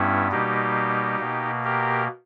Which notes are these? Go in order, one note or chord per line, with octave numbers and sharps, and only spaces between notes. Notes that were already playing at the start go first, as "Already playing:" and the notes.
Already playing: G2 G3 B3 C#4 E4
B2 G3 A#3 D#4 G4
B2 A#3
G4 A#4